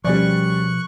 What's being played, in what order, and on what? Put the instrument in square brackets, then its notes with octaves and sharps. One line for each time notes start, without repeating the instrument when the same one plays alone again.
[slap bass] B2 F3 [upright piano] G3 C#4 D5 [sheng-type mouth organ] C#6 F#6